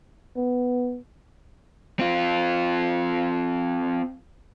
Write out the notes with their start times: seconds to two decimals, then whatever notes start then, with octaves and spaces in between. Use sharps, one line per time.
0.36 B3
1.99 C4 F4